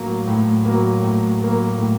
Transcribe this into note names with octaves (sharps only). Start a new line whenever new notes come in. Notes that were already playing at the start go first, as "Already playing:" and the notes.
Already playing: A2 F#3 A#3
A2
F#3 A#3
A2
F#3 A#3
A2